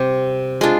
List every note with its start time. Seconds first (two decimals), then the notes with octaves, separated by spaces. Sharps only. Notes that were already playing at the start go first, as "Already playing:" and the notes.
Already playing: C3 G3 C4 G4
0.61 G#3 D4 F4